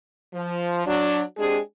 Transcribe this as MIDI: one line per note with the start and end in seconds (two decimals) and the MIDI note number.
0.34 0.84 53
0.87 1.22 54
0.87 1.22 62
1.38 1.59 56
1.38 1.59 60
1.38 1.59 62
1.38 1.59 67
1.38 1.59 68